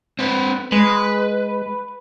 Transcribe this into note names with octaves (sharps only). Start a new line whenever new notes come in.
C4 B4
G#3 B4